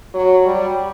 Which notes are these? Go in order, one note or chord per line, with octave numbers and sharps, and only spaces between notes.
F#3
G3